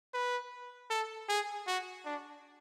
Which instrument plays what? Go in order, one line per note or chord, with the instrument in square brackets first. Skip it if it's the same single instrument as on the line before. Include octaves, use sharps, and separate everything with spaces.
[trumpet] B4
A4
G#4
F#4
D4